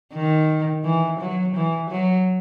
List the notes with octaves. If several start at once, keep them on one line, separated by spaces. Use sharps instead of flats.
D#3
E3
F#3
E3
F#3